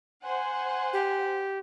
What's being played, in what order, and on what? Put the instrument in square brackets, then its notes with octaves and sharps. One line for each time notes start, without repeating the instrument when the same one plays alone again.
[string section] C5 F#5 G#5
[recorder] G4